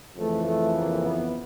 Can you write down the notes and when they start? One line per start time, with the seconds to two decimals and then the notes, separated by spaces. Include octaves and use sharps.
0.15 F2 C#3 E3 A3
0.45 A3
0.74 A#3
1.02 B3